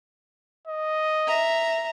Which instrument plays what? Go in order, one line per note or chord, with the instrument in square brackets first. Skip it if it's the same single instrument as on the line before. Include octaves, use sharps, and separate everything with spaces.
[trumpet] D#5
[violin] E5 A#5